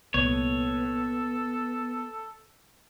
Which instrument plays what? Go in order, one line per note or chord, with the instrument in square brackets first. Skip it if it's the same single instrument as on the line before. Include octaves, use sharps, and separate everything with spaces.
[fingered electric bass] C2 A#2 [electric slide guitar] B3 [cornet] A4 [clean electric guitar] C#5